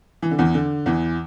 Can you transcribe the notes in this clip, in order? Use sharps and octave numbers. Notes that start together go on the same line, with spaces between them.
E3
D3
E2 E3
D3
E2 E3